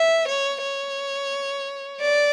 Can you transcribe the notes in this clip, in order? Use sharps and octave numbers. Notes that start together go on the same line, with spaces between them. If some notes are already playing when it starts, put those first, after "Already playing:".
Already playing: E5
C#5
C#5
D5